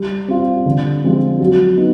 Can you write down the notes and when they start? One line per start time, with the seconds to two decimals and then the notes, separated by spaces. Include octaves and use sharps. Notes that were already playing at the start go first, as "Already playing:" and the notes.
Already playing: G3
0.28 C4 F4
0.66 D3
1.03 F3 G#3 C4 F4
1.40 F#3
1.77 B3 D#4